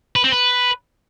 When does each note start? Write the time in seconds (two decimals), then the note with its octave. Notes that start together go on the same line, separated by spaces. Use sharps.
0.16 B4
0.24 C4
0.32 B4